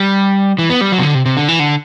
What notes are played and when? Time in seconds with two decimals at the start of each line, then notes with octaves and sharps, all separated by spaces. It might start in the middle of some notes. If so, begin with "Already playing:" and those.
Already playing: G3
0.58 E3
0.70 B3
0.81 G3
0.92 F#3
0.98 C3
1.03 D3
1.15 C3
1.26 C3
1.37 D3
1.48 E3
1.59 D3